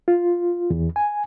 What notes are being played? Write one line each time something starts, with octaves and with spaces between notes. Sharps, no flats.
F4
E2
G#5